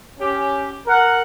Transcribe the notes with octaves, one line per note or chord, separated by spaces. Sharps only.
C#4 G4
A#4 F#5